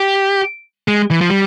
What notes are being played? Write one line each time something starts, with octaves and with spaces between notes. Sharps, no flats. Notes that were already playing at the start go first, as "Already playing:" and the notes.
Already playing: G4
G#3
E3
F3
G3